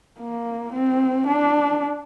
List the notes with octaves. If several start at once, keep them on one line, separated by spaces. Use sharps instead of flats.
A#3
C4
D4